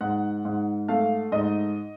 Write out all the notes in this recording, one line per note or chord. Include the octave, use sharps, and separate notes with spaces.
G#2 F#5
G#2
A3 F5
G#2 D#5